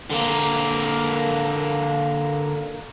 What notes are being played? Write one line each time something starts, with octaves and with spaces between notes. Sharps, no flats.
D3 A#3